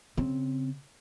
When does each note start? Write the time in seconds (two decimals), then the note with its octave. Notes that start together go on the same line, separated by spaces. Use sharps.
0.17 C#3 C4